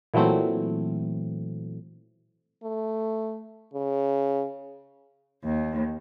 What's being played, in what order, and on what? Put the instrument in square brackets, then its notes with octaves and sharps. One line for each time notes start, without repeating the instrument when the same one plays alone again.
[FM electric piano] A#2 E3 F#3 A3 C4
[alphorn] A3
C#3
[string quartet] D#2